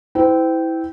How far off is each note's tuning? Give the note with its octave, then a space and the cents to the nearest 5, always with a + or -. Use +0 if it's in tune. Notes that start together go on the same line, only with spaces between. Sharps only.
E4 -15 C5 -40 G5 -15